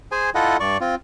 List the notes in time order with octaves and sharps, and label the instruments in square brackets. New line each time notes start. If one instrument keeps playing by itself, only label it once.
[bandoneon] G#4 C5 G#5
E4 F4 A4 D#5 F#5
G2 D5 C#6
C4 F4